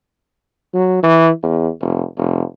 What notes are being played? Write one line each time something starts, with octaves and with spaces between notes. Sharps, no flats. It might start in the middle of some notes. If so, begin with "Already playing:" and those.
F#3
E3
E2
F1
F1